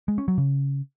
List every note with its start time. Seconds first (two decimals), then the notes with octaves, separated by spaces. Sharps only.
0.08 G#3
0.18 C#4
0.28 F#3
0.38 C#3